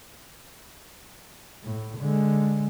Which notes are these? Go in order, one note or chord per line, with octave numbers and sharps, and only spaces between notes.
A2
D3 G#3